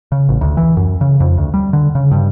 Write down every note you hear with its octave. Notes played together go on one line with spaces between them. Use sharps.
C#3
A1
D2
E3
F#2
C#3
F2
D2
G3
D3
C#3
G2